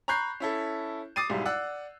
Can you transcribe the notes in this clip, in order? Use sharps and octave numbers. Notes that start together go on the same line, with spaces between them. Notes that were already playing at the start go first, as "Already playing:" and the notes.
A#5 B5 C#6 F#6 G6 C7
C#4 E4 A4
D6 D#6 A6 C7 D#7
B1 G#2 G3 E4
D5 F#5 E6 F#6